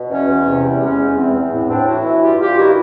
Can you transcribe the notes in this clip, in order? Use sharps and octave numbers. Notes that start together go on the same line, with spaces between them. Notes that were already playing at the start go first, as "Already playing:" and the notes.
Already playing: B2
E2 C#4
E2
C3
E2
G#3 C#4
E2
E2 C4
E2
A2
A2 C4 D4
E3 E4 F#4
E3
G2 F4 G4
G2 F4 G4
D#3 E4 F#4